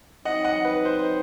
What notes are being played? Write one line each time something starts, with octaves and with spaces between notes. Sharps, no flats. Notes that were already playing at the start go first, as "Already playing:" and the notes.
F#3 C4 D#4 D#5 F#5
D#5 F#5
B4
C5